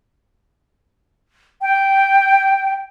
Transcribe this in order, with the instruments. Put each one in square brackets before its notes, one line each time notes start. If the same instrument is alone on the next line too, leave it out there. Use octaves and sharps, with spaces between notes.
[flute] G5